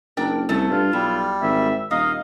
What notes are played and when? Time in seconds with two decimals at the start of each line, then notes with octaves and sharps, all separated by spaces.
0.17 F#1 D4 A#4 G5
0.49 C2 A3 C#4 A4
0.71 G2 F4
0.93 B1 G3 E4
1.42 G#1 E5
1.91 D#1 D#4 D#5 F5